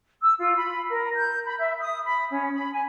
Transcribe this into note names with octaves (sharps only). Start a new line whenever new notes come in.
E6
F4
B5
A#4
G6
B5
E5
D#6
B5
C#4
B5
G#5